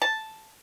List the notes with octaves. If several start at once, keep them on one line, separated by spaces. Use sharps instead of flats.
A5